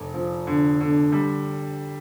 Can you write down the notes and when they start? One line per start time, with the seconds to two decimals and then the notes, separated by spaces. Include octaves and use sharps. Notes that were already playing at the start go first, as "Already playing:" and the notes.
Already playing: F1
0.14 F3
0.47 D3
0.80 D3
1.12 G3